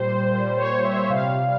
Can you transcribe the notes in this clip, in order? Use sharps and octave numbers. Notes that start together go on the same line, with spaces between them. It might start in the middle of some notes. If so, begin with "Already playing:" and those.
Already playing: A#2 G3 C5
A#2 G3
C#5
E5
C3 G3 F5